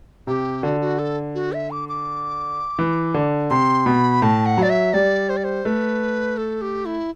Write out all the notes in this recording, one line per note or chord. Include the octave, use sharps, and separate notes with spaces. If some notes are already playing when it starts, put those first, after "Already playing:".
C3 G4
D3 F#4
F#4
A4
F#4
E5
D6
D6
E3
D3
C3 C6
B2 B5
A2 A5
F#5
F#3
D5
E5
G3 D5
C5
D5
C5
A3 B4
A4
G4
E4